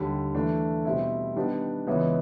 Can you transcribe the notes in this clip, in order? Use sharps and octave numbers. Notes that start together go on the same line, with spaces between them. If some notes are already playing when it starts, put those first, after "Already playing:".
Already playing: D#2 D3 G3
E3 A3 D4
B2 G3 C4 E4
D#3 G3 B3 D4 G4
C#2 C#3 E3 G#3 B3